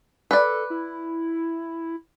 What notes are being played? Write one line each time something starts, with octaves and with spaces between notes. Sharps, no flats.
A4 B4 D5
E4